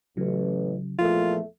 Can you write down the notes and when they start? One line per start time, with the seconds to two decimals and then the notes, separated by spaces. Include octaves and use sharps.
0.17 A1 C#3 F#3
0.99 E2 A#2 F3 A3 F4